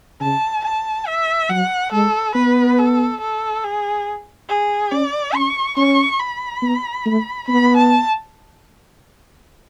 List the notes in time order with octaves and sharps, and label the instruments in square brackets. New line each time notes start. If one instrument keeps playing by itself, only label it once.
[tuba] C#3 [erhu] A5
[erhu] A5
E5
[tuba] F#3 [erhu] F#5
[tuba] G#3 [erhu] A4
[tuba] B3 [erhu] B4
[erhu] A4
A4
G#4
G#4
[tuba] C#4 [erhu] D5
[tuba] C#4 [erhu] C#6
[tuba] C#4 [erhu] C#6
[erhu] B5
[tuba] B3
A3
[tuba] B3 [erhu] B5
[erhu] A5